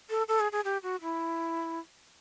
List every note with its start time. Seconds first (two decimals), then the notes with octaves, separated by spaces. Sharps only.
0.10 A4
0.28 A4
0.40 G#4
0.52 G#4
0.65 G4
0.83 F#4
1.02 E4